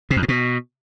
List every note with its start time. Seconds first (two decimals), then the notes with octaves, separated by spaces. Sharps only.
0.11 C3
0.16 F2
0.22 A2
0.28 B2